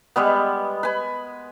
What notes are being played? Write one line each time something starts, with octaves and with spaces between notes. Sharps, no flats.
G3 G#3 B3
B4 G#5